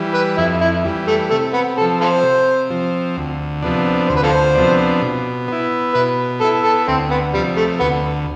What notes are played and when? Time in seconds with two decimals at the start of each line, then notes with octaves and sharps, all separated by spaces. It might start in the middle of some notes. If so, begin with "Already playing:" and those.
Already playing: E3 G3
0.14 B4
0.37 F2 E4
0.61 E4
0.85 E3 G3
1.07 A3
1.30 C3 A3
1.53 B3
1.77 C4 A4
1.81 F3
2.01 F4 A4 C5
2.23 C3
2.70 F3 C4
3.17 D2
3.62 C3 F3 B3 D4
4.09 D2 C5
4.16 B4
4.23 F4 A4 C5
4.55 C3 F3 B3 D4
5.02 B2
5.48 B3 E4
5.94 B2 B4
6.41 B3 E4 A4
6.65 A4
6.88 D2 C4
7.11 B3
7.34 C3 F3 G3
7.57 A3
7.80 D2 B3